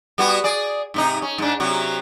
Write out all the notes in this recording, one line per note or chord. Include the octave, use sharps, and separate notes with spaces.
G3 B3 F#4
G#4 D5
G#2 C3 D#4
C#4
G#2 D4
C3 F#3 F#4